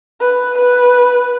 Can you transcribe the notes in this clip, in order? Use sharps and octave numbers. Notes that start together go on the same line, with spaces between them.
B4
B4